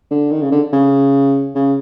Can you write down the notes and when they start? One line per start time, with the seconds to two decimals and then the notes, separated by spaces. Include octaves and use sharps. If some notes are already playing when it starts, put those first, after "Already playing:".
0.11 D3
0.31 D#3
0.42 C#3
0.52 D3
0.73 C#3
1.55 C#3